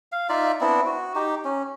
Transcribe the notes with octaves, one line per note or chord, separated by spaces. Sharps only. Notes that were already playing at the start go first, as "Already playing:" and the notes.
F5
D#4 F4 D5 E5
B3 C4 D4 E4
F#4
D#4 G4
C#4